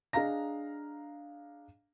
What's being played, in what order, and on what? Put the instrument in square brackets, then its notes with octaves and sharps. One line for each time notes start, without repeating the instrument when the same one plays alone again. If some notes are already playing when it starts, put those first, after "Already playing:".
[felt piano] D4 G#4 D#5 F5 A#5 A#6